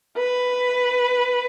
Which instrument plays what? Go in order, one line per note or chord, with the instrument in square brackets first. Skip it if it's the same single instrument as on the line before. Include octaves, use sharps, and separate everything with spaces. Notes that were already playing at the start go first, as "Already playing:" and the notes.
[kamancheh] B4